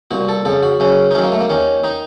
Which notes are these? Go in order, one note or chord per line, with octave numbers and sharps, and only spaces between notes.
C2 A#2 F#4
A4
F2 C#3 A4
F#4
F#2 C#3 C#4
D#4
F#2 D#3 C#4
A#3
A3
A#3
D#2 D#3 C#4
D#3 D#4